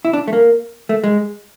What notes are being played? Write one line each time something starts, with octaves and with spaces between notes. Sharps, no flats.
E4
D4
A3
A#3
A3
G#3